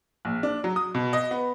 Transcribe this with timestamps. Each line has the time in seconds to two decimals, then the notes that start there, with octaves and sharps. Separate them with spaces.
0.25 A#1
0.43 D4
0.64 F#3
0.76 D#6
0.95 B2
1.13 D#5
1.31 B3